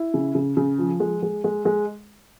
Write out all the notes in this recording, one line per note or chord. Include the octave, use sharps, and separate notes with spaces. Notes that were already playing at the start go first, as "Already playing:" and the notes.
Already playing: E4
C#3
C#3
C#3
F3
G#3
G#3
G#3
G#3